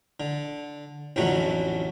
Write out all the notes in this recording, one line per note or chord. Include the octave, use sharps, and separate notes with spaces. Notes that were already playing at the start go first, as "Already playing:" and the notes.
D3
A1 F2 D3 F#3 A3 F#4